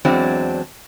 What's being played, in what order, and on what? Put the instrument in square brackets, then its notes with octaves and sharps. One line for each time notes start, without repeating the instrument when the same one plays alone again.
[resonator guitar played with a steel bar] E2 F#3 G#3 C4 D4